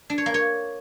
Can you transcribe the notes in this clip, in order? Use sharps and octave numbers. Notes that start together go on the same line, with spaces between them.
D4
C#5
A#3
C#5